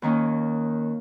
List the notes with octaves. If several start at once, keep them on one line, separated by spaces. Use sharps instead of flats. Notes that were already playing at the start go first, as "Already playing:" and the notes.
D#2 D#3 A#3 C#4